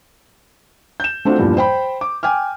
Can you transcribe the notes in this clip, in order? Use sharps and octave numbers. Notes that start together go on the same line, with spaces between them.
G6 E7
A3 C4 D4 F4 F#4
E2 G2 A#2 F3 G3
C5 G5 B5
D6
G5 G#5 D6 F6